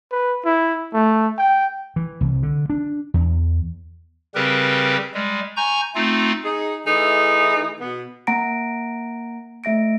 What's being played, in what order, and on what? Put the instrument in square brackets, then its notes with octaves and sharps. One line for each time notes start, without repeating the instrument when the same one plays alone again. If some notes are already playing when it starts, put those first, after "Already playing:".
[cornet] B4
E4
A3
G5
[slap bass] E3
C2
D3
D4
E2
[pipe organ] C#3 G3 C4 G4 A#4 B4
G3 G#3
G#5 A#5 C#6 G6
A3 C4 D#4 F4
[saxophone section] D#4 G#4
E3 A3 D#4 E4 G#4
B2 B3
[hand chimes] A#3 F#5 A#5 A#6 D7
A3 E5 A#6 D7